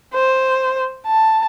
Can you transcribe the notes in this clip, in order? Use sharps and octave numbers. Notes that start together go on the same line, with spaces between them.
C5
A5